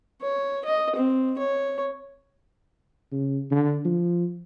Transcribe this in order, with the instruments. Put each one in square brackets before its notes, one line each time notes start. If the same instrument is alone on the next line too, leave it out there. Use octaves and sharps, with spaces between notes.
[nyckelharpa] C#5
D#5
C4
C#5
[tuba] C#3
D3
F3